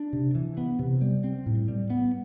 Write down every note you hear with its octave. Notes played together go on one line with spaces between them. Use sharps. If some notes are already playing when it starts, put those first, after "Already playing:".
Already playing: D4
C3
E3
B3
C3
G3
C4
A2
G3
B3